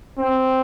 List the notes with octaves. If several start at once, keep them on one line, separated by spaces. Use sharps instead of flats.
C4